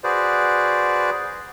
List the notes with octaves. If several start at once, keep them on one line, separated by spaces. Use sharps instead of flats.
F#4 G#4 B4 C5 D5